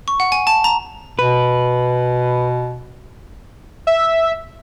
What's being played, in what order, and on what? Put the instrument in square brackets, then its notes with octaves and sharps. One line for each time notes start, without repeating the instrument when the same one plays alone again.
[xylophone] C#6
F#5
G#5
A5
A#5
[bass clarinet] B2 [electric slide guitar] B4
[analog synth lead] E5